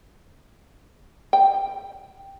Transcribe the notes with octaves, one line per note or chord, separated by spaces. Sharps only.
G5